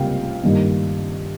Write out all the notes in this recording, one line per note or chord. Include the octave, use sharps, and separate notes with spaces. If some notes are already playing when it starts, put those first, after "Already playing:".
Already playing: C#2 C3 G3 A#3 F5 G5
G2 D#3 G3 A#3